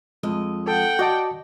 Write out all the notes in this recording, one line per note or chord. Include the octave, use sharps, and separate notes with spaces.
F2 G#3 D#5
A4 F#5 G5
F#4 D5 D#5 A5